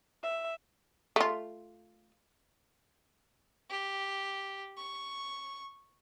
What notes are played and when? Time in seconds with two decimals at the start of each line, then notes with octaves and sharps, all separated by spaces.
0.23 E5
1.16 A3 F4
3.70 G4
4.77 C#6